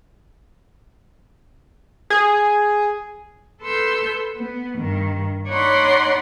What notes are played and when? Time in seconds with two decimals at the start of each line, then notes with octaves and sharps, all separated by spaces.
2.10 G#4
3.61 A4 B4 C6 E6 G6
4.36 B3
4.78 G2 D#3
5.48 D#4 C#5 D5 F#5 B5 C6